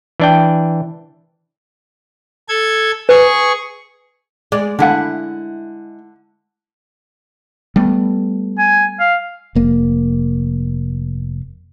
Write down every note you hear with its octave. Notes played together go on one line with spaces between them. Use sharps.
E3 D4 G5
A4 G#6
G#4 B4 C#6
G#3 D5
D3 G#3 E4 F#5
G3 A3 B3
G#5
F5
F1 A#3